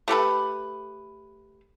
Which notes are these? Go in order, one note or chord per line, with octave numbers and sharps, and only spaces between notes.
A3 G4 A4 B4